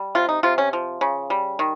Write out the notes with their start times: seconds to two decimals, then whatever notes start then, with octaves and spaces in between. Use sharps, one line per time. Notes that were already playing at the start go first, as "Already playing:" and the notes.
Already playing: G3
0.15 C3 F4
0.29 D#4
0.43 C3 F4
0.58 C#4
0.73 F3
1.01 C#3
1.30 G3
1.59 D#3